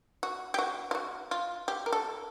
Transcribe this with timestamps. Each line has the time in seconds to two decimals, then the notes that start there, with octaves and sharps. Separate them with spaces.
0.23 F#4
0.54 G4
0.59 F#4
0.91 F4
0.95 F#4
1.31 F4
1.68 G4
1.86 A#4
1.92 A4